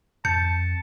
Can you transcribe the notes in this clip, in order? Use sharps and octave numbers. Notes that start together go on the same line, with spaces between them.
F2 A5 G6 C#7